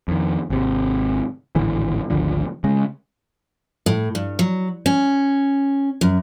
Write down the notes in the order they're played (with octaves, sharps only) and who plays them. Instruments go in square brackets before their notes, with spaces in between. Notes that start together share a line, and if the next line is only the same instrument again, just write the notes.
[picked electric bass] F2 D#3
G#1 C3
G#1 D2 A2 E3
G#1 D2 D3 F3
C#3 G#3
[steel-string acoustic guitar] A2
G2
F#3
C#4
F#2